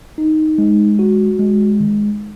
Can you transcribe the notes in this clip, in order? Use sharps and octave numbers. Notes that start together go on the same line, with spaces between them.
D#4
G#3
F#4
G#3
D#3